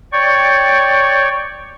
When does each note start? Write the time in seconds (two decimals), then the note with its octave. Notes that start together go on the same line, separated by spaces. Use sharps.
0.12 C#5 D5 G5 C#6